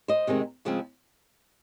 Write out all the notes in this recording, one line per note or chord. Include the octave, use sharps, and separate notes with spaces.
C5 D#5
C3 D#3 G#3 C4
C#3 F3 G#3 C4